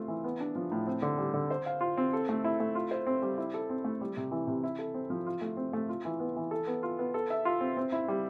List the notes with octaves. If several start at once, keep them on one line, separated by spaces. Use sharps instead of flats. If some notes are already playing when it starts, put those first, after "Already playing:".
Already playing: A3 C4 F4
E3
B3
D4
F3
A2
C4
D3
G3
D3
C5
F5
F4
C4
A4
A3
E4
A3
F4
C5
C4
G3
E4
A4
C4
A3
G3
C3
E3
C3
E4
A4
C4
F3
F4
A3
C4
A3
F4
E3
B3
E3
A4
B3
F4
B3
A4
E5
F4
C4
C4
E4
G3